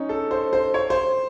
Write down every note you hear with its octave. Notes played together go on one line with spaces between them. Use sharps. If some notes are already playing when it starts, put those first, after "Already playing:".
Already playing: C#4 D#4
A4
C5
C5
C#5
C5